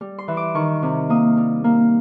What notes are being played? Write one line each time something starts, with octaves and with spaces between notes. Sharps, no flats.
G3
C6
E3
D6
D#3 C#6
C3
A#3 D#6
G3
A#3